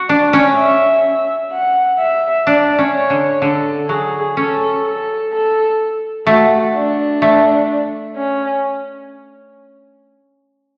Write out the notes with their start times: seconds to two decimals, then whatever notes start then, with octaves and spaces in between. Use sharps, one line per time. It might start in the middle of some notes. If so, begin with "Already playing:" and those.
Already playing: F#4
0.09 D4 D5
0.33 C#4
0.56 E5
1.52 F#5
1.99 E5
2.47 D4 D5
2.78 C#4
2.94 C#5
3.10 D3
3.41 D3 A4
3.89 F#3 G#4
4.37 C#4 A4
4.84 A4
5.32 A4
6.27 A3 F#4
6.75 D4
7.22 A3
8.16 C#4